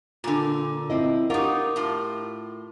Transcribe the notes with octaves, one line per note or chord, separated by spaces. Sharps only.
A#2 D3 F4
C4 E4 D#5
D#4 F4 G4 A#4 F#5 C#6 D6
A2 F4